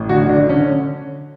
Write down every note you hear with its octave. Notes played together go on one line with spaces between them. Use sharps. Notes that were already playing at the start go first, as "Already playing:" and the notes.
Already playing: A1
D3 F#4
D3 D4
D3 C#4